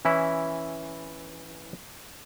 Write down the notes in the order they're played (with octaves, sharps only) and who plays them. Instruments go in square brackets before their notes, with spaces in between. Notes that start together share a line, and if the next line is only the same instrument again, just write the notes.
[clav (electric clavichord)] E3 C#4 E4